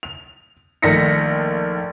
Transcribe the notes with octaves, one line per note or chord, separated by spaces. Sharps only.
F7
A#1 D#3 A3 A#6 B6 C#7